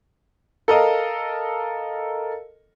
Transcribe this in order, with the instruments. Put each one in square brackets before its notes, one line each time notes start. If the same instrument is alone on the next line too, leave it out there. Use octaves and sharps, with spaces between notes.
[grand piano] A4 A#4 D#5 F5